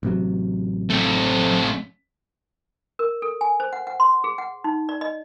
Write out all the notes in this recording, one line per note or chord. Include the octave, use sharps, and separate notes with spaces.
A1 C3 F#3
A3 C4
A#4
A4
G#5
C5
F#5
F#5
C6
G#4
F#5
D#4
D5
D#5